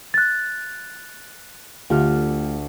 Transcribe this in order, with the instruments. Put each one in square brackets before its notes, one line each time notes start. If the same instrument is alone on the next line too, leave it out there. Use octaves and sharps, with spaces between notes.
[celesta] F#6 A6
[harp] D2 F6 [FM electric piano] A3 F4 G4